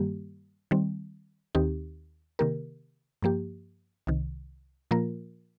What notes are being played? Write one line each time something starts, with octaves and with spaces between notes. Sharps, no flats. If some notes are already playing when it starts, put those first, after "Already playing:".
Already playing: G2 D#3 G3 A#3 G4
D#3 G3 C4
D#2 D#3 C4 D#4 G4
C3 D#3 A#3 G4 A#4
G2 F3 A#3 G4
C2 C3 D#3
A#2 F3 A#3 F4 A#4